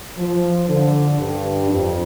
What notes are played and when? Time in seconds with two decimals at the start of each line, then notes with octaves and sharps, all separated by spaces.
0.16 F3
0.68 D3
1.19 G2
1.69 F2